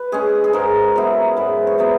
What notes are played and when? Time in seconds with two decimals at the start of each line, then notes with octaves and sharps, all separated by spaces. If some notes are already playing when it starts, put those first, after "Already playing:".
Already playing: B4
0.12 G#3 C#4 G#4
0.44 G#4
0.53 G#2 A#4
0.96 F#3 B3 E4
1.37 G#2 B4
1.67 C#5
1.78 F#3 B3 E4 B4